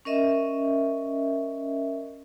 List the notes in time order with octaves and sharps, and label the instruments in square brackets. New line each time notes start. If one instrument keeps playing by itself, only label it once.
[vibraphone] C#4 A#4 D#5 E5